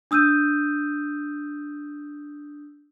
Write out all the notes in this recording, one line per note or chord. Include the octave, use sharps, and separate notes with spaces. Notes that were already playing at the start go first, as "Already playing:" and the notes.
D4 D#6 E6 G6 D#7